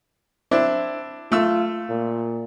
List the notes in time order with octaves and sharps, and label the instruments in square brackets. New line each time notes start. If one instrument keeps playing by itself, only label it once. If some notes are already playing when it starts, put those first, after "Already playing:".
[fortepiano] C4 D4 E4
[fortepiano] A3 E6 [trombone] F4
[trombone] A#2